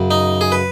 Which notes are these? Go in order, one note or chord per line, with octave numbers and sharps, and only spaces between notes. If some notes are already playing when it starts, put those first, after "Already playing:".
Already playing: F#2 C#3
D#4
G#4
B4